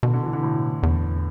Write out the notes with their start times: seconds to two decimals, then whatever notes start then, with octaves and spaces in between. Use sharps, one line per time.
0.03 B2 D3
0.13 D3
0.23 E3
0.33 D3
0.43 A2
0.83 E2